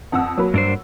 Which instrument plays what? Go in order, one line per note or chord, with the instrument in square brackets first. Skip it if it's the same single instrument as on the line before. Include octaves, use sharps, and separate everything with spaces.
[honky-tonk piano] F2 F#5 E6
F#3 A#3 B5
[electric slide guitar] G2 D4 C5